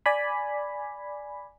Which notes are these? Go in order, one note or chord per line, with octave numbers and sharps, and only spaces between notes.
D5 G#5 B5